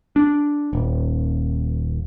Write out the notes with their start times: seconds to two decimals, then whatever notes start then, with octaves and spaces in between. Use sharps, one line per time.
0.16 D4
0.73 D#1